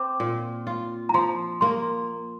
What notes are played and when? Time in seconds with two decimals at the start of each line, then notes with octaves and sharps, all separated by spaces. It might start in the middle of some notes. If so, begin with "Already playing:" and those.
Already playing: C4 D6
0.20 A#2
0.67 F4
1.09 A#5
1.14 F3 C6
1.61 A#3 C6